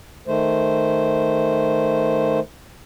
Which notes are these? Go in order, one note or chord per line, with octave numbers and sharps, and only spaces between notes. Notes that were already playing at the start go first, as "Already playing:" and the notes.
D#3 A3 C5